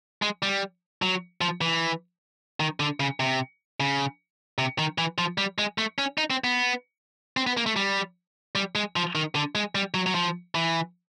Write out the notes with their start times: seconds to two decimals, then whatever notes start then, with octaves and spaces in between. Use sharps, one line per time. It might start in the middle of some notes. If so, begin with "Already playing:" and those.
0.22 G#3
0.43 G3
1.02 F#3
1.41 F3
1.61 E3
2.60 D#3
2.80 D3
3.00 C#3
3.20 C3
3.80 C#3
4.58 C3
4.79 D#3
4.98 E3
5.18 F3
5.38 G3
5.58 G#3
5.78 A3
5.98 C#4
6.18 D#4
6.30 C4
6.44 B3
7.37 C4
7.47 B3
7.57 A#3
7.66 A3
7.76 G3
8.55 G3
8.75 G#3
8.96 F3
9.15 D#3
9.35 D3
9.55 G#3
9.75 G3
9.94 F#3
10.06 F#3
10.15 F3
10.55 E3